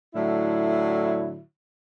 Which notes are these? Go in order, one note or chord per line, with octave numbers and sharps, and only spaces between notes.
A2 D3 F#3 E4